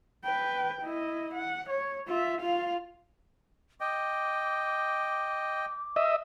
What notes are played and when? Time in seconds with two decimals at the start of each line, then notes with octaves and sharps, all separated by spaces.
0.24 B4 G5
0.82 E4 D#5
1.34 F#5
1.70 C#5
2.07 F4 E5
2.41 F4 F5
3.81 D#5 G5 D6
5.96 D#5 E5